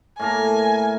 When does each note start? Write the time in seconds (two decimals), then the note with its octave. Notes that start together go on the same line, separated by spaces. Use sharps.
0.19 A2 A#3 G#5 A#5